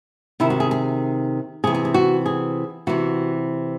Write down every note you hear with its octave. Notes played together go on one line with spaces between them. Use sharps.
C3 D#3 E4
F#4
G#4
G#4
C3 E3 G#4
G#4
G#4
F#4
G#4
C3 E3 F#4